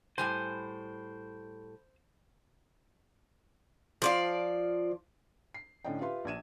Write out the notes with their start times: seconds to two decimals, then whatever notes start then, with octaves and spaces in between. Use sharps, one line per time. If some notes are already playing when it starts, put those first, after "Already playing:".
0.18 A2 G3 C5 G#5
4.02 F3 D5 F5
5.54 C7
5.85 A2 D3 C#4 D4 D#5 G5
6.01 F4 G4 B4 E5 F5 C6
6.25 A#1 D4 G#6 D#7 E7